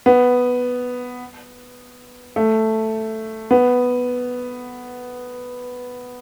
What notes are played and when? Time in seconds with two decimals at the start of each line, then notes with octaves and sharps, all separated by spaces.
0.06 B3
2.36 A3
3.51 B3